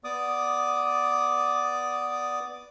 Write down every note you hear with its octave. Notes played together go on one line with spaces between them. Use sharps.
B3 D5 D6 D#6